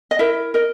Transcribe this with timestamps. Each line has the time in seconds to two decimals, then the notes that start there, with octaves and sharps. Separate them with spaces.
0.11 D#5
0.19 E4 A#4 E5
0.54 A#4 D#5